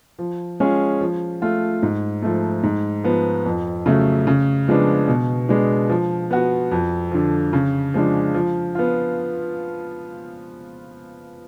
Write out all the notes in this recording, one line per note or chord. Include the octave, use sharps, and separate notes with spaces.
F3
G#3 C#4 F4 G#4
F3
A3 F4
G#2
F3 A3
G#2
F3 B3
F2
C#3 F#3 A3
C#3
F3 G#3 B3 D4
B2
G#3 B3 D4
F3
B3 F#4
F2
D3 F3
C#3
F3 G#3 D4
F3
B3 F4